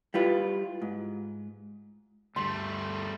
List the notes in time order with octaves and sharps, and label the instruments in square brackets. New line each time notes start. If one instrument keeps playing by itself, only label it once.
[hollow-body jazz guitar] G3 E4 F4 B4
G#2
[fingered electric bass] D2 G2 [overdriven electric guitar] G3 A3 [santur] C6